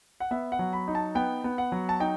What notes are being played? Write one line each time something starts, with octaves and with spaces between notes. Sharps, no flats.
F#5
B3 E5
F#5
F#3
B5
D#4
A5
B3 G5
B3
F#5
F#3
A5
D#4 G5